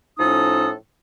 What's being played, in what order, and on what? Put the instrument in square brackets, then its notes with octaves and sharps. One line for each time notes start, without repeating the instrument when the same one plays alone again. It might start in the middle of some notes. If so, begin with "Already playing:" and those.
[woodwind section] A2 F3 C#4 D#4 A4 D#6